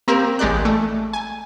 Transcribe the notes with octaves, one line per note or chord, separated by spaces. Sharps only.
A#3 C4 G4 A#4
A1 G#3 G4 D5 F#6
A3
G#5